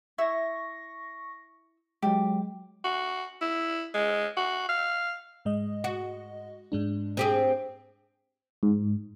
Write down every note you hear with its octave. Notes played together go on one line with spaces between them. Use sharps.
E4 E5 C#6 A#6
F#3 G#3 G4
F#4
E4
G#3
F#4
F5
G#2 G#3 D#5
F#4
G#2 G#3 D4
C4 G4 G#4
G#2